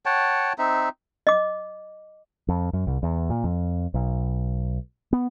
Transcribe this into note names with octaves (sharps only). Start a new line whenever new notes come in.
C#5 F#5 G5 A5
C4 D#4 E5
D#5 D6
F2
F#2
C2
E2
A#2
F2
B1
B3